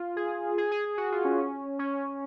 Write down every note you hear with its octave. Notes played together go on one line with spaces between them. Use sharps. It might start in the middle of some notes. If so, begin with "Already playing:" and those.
Already playing: F4
G#4
G#4
G#4
G#4
F#4
F4
C#4
C#4
C#4